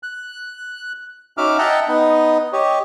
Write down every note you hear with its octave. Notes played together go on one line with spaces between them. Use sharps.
F#6
C#4 D#4 F#4 E5 D6 F6
D#5 E5 F#5 G5 A5 A#5
B3 D#4 D#5
G4 C#5 D#5